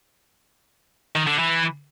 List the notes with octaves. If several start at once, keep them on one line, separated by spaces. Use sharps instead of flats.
D#3
D3
E3